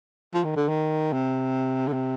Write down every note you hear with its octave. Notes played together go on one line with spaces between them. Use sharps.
F3
D#3
D3
D#3
C3
D3
C3